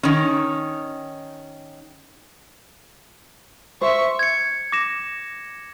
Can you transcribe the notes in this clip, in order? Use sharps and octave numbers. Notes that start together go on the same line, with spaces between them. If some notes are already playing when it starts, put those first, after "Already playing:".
D#3 C#4
C5 E5 C#6
G#6 C#7
D6 A#6 E7